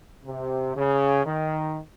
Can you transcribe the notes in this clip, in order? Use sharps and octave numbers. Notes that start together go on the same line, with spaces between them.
C3
C#3
D#3